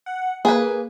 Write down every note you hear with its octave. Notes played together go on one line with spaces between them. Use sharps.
F#5
A#3 G#4 B4